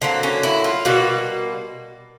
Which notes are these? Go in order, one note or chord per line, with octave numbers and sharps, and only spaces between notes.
D3 F#3 A#3 C4
C#4
E4
F4
B2 G3 A#3 F#4